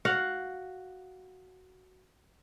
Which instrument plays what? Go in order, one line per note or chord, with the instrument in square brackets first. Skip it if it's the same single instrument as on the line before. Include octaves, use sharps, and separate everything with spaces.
[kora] F#4 F5 F#5